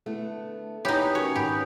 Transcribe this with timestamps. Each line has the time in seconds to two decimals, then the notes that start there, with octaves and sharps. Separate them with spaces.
0.06 D3 A3 B3 E4
0.85 B3 D#4 E4 G4 C#5 E5 G#5 B5
1.15 C#4 F#4 A#4 C#5
1.36 G#1 B3 G4 A#4 B5